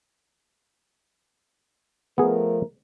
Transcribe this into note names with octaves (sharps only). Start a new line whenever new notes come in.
F3 A3 B3 G#4 A#4